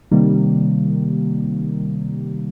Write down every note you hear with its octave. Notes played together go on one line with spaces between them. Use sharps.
C3 D#3 G3 A#3